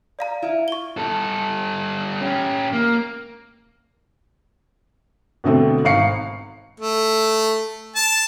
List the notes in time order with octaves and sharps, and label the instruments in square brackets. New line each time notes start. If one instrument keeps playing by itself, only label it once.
[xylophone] D5 F5 A#5
[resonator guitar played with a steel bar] E4 F4
[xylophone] C#6 G7
[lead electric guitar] G3 A4
C#4 G4
A#3
[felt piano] B2 D3 A3 C4
G#1 F5 C#6 C7 C#7
[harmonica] A3
A5